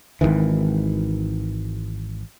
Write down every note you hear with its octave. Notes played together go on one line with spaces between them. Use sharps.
G#1 E2 D#3 E3